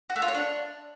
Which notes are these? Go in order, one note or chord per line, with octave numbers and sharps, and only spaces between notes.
F#4
A3
F4
C#5
D4